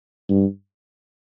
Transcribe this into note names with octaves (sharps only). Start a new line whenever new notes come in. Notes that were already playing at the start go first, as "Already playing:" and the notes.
G2